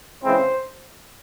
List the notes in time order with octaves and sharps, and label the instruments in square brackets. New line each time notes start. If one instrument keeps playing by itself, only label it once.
[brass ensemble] C#3 E3 G#3 C4 E4 C5